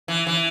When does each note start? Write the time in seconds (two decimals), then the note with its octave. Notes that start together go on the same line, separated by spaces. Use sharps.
0.08 E3
0.27 E3